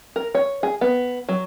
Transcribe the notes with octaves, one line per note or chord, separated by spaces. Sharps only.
A#4
C#5
G#4
B3
F#3